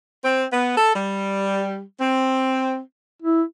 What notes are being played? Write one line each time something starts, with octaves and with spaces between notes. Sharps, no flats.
C4
B3
A4
G3
C4
E4